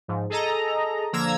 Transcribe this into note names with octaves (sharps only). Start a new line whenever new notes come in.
G#2 F3
G#4 A4 D#5 A#5
D3 F3 A#3 A#5 E6 G#6